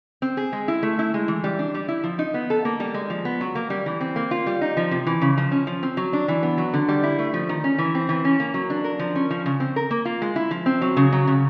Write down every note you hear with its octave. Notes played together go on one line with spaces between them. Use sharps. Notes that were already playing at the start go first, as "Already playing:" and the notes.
C4
G#4
G#3
E4
A3
E4
G#3
E3
G3
D4
G3
E4
F3
D#4
B3
A4
A#3
G3
G#3
F3
B3
F#3
A#3
G3
E3
C4
A#3
F4
G3
D#4
F3
C3
E3
C#3
F3
C#4
F3
C4
F#3
D4
E3
B3
F#3
D3
G3
E4
A3
F3
D#3
C#4
E3
C4
E3
C#4
A#3
F#3
D4
A#4
F3
C#4
F3
C#3
C4
A#4
A#3
F4
G#3
E4
F3
C4
F#3
C#3
F#3
C#3